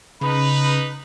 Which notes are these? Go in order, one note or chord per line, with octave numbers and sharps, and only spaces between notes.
C#3 D#4 B4 B5